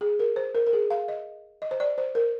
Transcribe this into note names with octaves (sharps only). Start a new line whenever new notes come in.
G#4
A#4
C5
A#4
A#4
G#4
F5
D#5
D#5
C5
D5
C5
A#4